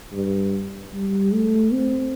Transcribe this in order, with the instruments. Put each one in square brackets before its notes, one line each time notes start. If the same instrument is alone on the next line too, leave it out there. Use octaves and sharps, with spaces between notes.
[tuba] G2
G3
A3
C4